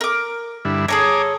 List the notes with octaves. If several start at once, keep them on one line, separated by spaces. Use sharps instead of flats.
A#4 D6
G2 D3 E4
G#4 A4 C#5 G#5 A#5 D6